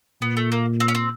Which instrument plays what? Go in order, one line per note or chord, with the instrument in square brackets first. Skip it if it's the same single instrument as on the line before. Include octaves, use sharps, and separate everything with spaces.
[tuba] A#2 [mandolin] B3
[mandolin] A3
A#3
C4
C#4
C4